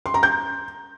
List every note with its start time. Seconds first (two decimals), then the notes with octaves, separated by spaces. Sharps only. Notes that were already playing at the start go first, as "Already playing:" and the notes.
0.06 C6
0.14 A#5
0.23 G6